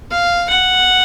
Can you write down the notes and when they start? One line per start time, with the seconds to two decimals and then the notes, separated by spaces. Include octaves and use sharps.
0.11 F5
0.50 F#5